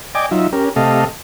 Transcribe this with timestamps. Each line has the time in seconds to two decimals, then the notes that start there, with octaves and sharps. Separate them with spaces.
0.15 D5 D#5 G5 G#5 D6
0.31 F#3 D#4 F4 E5
0.52 C#4 G4 A#4
0.76 C3 A3 G4 A4 D#5 F5